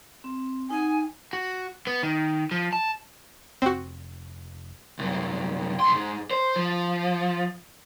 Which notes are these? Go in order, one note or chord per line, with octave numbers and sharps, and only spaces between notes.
C4
D#4 F#5 G#5
F#4
B3
D#3
F3
A5
F1 C4 F#4
C2 F#2
B1 C6
G#2
C5
F3